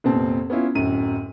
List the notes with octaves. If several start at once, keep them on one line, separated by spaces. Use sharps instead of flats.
F1 A#2 B3 C4 A5
B3 C#4 E4 F4
D1 F#2 D#7